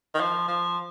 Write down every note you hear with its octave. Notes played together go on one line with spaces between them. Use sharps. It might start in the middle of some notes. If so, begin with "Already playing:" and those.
D#3
F3
F3